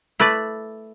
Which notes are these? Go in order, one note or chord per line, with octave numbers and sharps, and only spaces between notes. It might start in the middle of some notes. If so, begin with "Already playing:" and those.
A3 E4 B4 D5